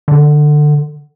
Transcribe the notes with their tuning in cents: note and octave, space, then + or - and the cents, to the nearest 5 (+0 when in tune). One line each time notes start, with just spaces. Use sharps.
D3 +20